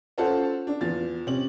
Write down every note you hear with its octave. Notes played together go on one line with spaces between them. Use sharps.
C#4 F4 A4 C5 F#5 A5
D4
E2 F4 A6
C3 C#4 F#7